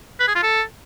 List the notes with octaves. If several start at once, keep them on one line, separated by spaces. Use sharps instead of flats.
B4
G#4
F4
A4